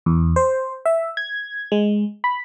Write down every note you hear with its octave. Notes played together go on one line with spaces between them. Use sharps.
E2
C5
E5
G#6
G#3
B5